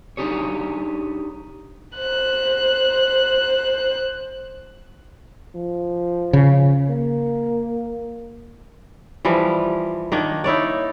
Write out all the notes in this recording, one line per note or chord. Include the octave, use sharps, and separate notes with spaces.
D4 D#4 G4 G#4 C#5
C5 F#6
F3
C#3
A#3
E3 F3 G3
D#3 A#3 D4
D#4 E4 C#5 D5